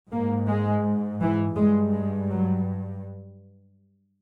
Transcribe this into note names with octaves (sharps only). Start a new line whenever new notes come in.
G#2 A#3
G#3
E3
G2 G#3
G#3
F#3